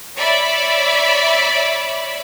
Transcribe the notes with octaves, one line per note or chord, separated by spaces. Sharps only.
C#5 D5 E5 B5